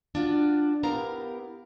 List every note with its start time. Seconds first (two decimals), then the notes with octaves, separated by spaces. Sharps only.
0.15 D4 F4 F#4
0.83 B3 E4 G4 A#4 F5 A#5